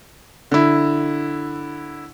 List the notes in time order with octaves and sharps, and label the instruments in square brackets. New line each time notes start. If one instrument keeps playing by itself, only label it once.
[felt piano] D3 E4